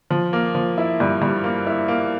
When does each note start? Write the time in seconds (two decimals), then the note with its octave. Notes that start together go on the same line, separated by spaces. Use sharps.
0.10 F3
0.33 A#3
0.55 F3
0.78 E4
1.00 G2
1.22 G2
1.44 A#3
1.67 E4
1.88 A#3